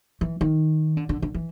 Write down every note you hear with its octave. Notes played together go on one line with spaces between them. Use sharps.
E3
D#3
D3
D3
D3
E3